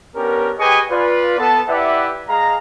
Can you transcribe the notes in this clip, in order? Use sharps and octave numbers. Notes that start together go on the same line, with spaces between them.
B3 C#4 D4 G4 A#4
G4 G#4 B4 D#5 G#5 C#6
F4 B4 D5
B3 A4 A5
E4 G4 B4 D5 E5 F#5
G#3 G#4 F5 A#5